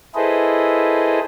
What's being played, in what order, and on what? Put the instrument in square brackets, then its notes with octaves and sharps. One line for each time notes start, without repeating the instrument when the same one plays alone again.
[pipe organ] E4 G#4 A4 B4 C5 D#5